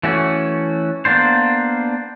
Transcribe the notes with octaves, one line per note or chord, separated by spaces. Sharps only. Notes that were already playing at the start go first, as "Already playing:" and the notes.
E3 A3 C#4 F#4
A#3 B3 D4 C5